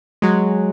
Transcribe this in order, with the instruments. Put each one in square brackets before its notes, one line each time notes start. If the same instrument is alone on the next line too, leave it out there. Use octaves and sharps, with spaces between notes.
[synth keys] F#3 G#3